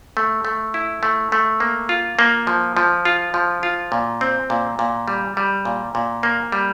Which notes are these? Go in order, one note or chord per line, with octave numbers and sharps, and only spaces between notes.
A3
A3
E4
A3
A3
A#3
F4
A#3
F3
F3
F4
F3
F4
A#2
C4
A#2
A#2
G3
G3
A#2
A#2
A#3
G3